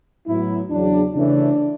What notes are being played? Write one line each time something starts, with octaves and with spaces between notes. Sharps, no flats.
A2 F#3 B3 E4
E2 C#3 F#3 D4
C#3 E3 A3 C#4 D4